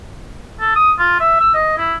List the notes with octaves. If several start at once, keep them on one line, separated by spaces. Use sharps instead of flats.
A4
D#6
F4
E5
E6
D#5
E4